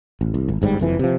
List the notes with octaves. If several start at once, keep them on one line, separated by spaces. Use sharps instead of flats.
A1
C2
G#1
G1 G#2 B2 G3
F#1 F2 E3
C3 F3